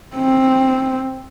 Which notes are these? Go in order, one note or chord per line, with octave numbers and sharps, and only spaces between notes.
C4